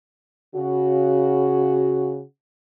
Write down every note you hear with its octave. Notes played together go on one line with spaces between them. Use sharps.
C#3 F#4